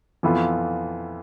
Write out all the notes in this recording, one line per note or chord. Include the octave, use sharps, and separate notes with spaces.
F2 E3 B3 F4